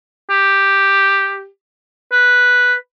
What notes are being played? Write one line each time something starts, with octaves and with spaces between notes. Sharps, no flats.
G4
B4